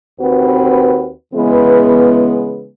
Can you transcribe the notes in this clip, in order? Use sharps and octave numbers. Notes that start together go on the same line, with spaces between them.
D#2 C4 F#4 B4
C#3 E3 G#3 B3